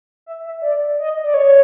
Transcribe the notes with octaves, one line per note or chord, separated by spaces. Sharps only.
E5
E5
D5
D#5
D5
C#5